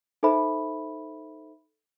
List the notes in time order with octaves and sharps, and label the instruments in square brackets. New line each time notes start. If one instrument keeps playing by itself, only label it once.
[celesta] D#4 A4 C5 E5 B5